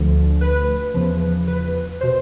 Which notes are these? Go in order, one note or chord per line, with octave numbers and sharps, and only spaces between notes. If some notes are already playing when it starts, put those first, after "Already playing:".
Already playing: D2 D3 F3
B4
E2 C#3 F3
B4
B2 C5